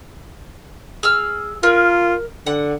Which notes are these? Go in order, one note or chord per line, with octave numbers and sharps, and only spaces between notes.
G#4 E6 F6
F4 A#4
D3 F#5